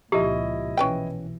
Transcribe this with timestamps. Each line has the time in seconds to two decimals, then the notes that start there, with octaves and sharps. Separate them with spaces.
0.12 C#2 A#2 F3 E4 G4 D#5
0.77 B1 E3 C#4 B4 G5